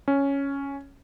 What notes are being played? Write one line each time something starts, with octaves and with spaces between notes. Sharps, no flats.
C#4